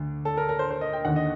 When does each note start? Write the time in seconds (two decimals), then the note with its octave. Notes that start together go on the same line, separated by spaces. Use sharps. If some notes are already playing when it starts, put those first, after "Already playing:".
Already playing: D2 D3
0.25 A4
0.37 A#4
0.49 A#4
0.59 C5
0.70 C5
0.81 D#5
0.93 G5
1.05 D#2 D3 F#5
1.16 D#5